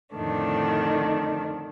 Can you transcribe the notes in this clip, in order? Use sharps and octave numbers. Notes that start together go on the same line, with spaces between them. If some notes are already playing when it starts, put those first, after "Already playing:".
F2 A2 D3 D#3 A3 D4